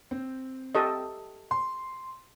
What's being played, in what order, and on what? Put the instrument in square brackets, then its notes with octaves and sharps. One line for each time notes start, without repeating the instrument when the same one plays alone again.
[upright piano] C4
[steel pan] G4 A4 D#5
[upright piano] C6